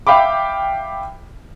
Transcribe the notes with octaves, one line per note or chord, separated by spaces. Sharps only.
E5 F5 G5 B5 D6